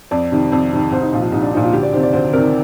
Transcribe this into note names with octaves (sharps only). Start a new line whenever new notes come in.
F2 D5
C3 D#3
F2
C3 D#3
C2 C5
D#4
A#2 F3 D#4
F4
C2 D#4
D4
A#2 F3 D#4
F4
D2 G4
D5
C3 D#3 C5
D5
D2 C5
C3 D#3 A#4